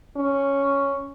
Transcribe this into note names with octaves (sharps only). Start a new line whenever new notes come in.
C#4